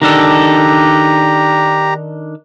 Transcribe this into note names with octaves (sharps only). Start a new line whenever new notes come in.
D#3 D4 G4 A4 A#5